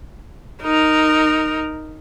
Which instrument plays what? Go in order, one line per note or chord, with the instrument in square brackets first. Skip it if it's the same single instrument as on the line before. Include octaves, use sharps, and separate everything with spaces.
[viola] D#4 A#4